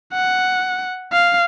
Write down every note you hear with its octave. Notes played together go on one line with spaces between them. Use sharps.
F#5
F5